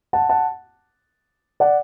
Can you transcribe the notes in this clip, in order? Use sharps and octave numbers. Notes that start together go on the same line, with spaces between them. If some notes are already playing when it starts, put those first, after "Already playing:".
F#5 A5
F#5 A5
D5 F#5